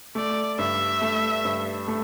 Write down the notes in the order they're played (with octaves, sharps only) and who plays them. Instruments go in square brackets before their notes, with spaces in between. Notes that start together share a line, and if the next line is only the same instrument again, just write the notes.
[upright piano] A3 [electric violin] D5
[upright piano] G2 [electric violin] E5
[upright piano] A3
G2
A3